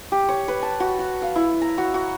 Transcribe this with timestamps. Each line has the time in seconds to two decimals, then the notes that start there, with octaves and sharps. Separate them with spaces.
0.12 G4
0.29 C#5
0.48 B4
0.63 A5
0.80 F#4
0.99 F#4
1.22 F5
1.36 E4
1.62 A#5
1.78 F#4
1.94 F#4